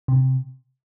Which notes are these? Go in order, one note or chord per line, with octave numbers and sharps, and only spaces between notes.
C3